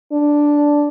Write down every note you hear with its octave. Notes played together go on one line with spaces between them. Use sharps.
D4